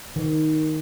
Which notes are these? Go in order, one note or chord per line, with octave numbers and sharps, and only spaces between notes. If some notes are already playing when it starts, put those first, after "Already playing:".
D#3